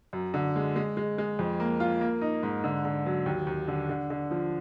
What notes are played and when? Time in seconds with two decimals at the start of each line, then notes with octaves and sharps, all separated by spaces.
0.13 F#2
0.34 D3
0.56 G#3
0.76 G#3
0.97 G#3
1.18 G#3
1.39 F2
1.60 A#3
1.80 F4
2.01 A#3
2.21 D#4
2.43 G#2
2.64 D3
2.85 D3
3.06 F#3
3.26 D#2
3.47 D#2
3.68 D3
3.89 D3
4.10 D3
4.31 F3